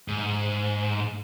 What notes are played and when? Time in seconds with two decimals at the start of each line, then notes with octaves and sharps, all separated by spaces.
0.08 G#2